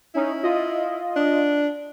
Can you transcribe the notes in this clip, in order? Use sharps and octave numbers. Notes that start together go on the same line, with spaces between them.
C#4 D#4 E4
F4 D#5
D4